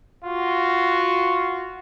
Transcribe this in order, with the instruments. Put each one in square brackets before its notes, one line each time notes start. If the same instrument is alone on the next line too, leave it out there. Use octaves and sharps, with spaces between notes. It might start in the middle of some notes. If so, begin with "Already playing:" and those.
[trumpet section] F4 F#4